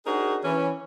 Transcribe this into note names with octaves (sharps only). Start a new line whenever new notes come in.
D4 D#4 F#4 G#4 A#4 C5
E3 C#4